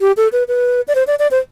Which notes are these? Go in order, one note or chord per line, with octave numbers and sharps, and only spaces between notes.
G4
A4
B4
B4
D5
C5
D5
D5
C5